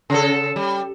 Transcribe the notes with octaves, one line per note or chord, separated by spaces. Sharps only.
C#3 A4
G3